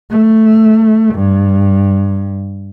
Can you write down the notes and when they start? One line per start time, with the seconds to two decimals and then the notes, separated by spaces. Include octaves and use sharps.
0.11 A3
1.15 G2